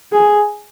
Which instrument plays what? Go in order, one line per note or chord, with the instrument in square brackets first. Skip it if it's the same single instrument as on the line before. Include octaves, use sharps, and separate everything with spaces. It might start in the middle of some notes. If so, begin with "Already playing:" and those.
[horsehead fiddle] G#4